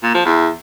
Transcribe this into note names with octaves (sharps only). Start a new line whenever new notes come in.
A#2
F3
E2